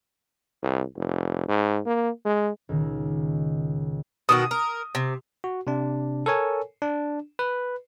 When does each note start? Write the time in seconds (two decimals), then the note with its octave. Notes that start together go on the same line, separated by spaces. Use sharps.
0.62 C2
0.96 F1
1.48 G#2
1.86 A#3
2.25 G#3
2.69 C#2 A#2 D#3
4.29 B2 D#3 F#4 D#6
4.51 A#4
4.95 C3
5.44 F#4
5.67 C3 D4
6.26 A4 A#4 C#5 G#5
6.82 D4
7.39 B4